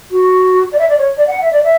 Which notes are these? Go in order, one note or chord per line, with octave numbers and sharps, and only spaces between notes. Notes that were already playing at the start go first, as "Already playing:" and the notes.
F#4
D5
E5
D5
C#5
D5
F#5
E5
D5
E5